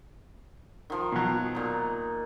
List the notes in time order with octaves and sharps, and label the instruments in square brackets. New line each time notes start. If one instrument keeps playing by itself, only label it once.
[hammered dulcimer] D#3 F3
[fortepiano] B2 F#3
[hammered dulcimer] A#2 D#4